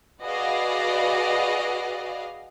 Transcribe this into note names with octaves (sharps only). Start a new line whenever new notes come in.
F#4 G#4 B4 D5 D#5 F5